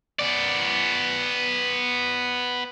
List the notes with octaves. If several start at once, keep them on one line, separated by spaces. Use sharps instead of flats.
B3 D5